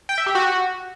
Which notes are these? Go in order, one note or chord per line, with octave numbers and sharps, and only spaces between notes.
G5
E5
G4
F#4